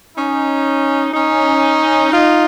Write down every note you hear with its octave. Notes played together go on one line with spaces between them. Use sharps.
C#4 D#4
C#4 D#4
D#4 F4